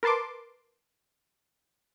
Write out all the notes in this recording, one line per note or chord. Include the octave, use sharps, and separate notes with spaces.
A#4 B4 A5 C6 D6